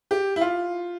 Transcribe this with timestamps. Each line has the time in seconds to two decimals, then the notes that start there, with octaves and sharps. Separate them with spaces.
0.11 G4
0.36 E4
0.41 F4